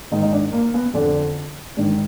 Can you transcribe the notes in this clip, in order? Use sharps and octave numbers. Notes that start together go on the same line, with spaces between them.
G#2 D#3 D#4
D#4
D4
A#3
B3
F2 D3 D4
G#2 D#3 D4